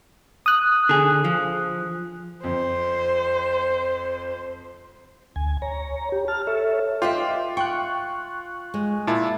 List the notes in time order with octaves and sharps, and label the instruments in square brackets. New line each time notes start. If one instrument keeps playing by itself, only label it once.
[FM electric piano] D#6 F#6
[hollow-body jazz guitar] D3 G#4
F3
[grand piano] F2 [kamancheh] C5
[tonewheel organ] D2 G#5
C#5 A#5
G4
A5 F6
A4 C#5 E5
[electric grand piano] F4 [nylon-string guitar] B4 D#5 E5 [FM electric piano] G5 C6 D6
[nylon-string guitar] G5 [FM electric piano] C#6 F#6
[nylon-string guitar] G#3
[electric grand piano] A#2 E4 [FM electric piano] A5